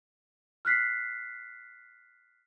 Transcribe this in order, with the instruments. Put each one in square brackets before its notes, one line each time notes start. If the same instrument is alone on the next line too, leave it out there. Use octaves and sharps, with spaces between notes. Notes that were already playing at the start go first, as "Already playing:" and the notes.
[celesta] F6 F#6 B6 C7